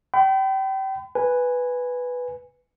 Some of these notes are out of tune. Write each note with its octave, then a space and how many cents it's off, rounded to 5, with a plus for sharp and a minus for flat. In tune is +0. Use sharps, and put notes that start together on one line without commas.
G5 -30 B5 +35
B4 +0 G#5 -10